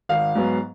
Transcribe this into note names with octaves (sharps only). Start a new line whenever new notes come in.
G#1 F5
G#2 F#3 B3